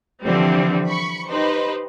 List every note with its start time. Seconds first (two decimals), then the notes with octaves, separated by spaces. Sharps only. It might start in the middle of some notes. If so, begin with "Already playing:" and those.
0.24 D3 E3 F3 G3 C4
0.88 B5 C#6 C#7
1.29 D#4 G4 B4 C5